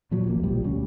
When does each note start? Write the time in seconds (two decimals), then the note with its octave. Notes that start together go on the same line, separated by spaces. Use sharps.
0.11 A#2 F3 F#3
0.26 D#1 A1 A#3
0.43 B1 A#2 F3 G3
0.64 D2 G3 C#4